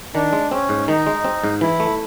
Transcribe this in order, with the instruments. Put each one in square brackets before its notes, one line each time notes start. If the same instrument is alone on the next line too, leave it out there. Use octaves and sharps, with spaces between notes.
[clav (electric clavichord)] D#3 [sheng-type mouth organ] D4
[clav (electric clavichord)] G#3
[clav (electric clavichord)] C4 [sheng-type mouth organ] C#4
[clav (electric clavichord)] G#2
[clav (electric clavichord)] D#3 [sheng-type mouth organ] D#4
[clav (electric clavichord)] G#3
C4
G#2
[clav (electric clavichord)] E3 [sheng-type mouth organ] E4
[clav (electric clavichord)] A3